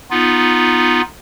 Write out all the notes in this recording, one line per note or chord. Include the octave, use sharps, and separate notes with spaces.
B3 D#4 F4